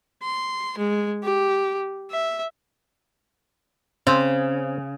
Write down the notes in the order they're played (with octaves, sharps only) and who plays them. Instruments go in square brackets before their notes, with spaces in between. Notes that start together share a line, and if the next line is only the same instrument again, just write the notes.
[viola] C6
G#3
G4
E5
[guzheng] C#3 [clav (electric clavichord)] C4